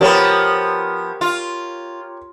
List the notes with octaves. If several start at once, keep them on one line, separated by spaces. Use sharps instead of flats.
F3 B3 G4 A#4 C#5
F4